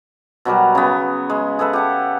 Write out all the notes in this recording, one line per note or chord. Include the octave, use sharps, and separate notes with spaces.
B2 F#3 G3 A#4
C#3 B3
G#3
G#4 A4 B4 E5
G4 F#5 A5